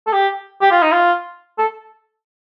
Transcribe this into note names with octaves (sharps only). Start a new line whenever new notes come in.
A4
G4
G4
F4
D#4
F4
A4